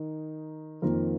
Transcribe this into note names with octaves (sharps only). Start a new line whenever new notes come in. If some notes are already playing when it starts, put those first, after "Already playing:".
Already playing: D#3 D#4
F2 D#3 A#3 F4 A#4